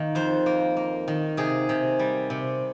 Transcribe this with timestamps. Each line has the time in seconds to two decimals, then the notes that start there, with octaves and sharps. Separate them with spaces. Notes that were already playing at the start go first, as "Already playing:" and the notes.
Already playing: D#3 A#3
0.15 F2 C5
0.46 A#3
0.77 A#3
1.08 D#3
1.37 C3 G#4
1.69 C3
1.99 G3
2.30 C3